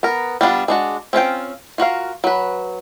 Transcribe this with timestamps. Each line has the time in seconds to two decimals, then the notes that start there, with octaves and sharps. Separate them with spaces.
0.03 B3 A#4
0.41 G3 B3 D4 F4
0.68 G#3 D4 F#4
1.13 C4 C#4 F4 G5
1.78 F4 F#4 A#4 F5
2.24 F#3 B4